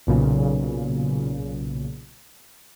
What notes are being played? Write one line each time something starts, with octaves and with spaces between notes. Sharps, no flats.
B1 A#2 C#3